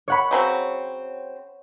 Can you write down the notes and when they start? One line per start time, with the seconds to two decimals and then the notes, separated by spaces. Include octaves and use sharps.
0.08 C#5 F#5 B5
0.31 C#3 F#3 C4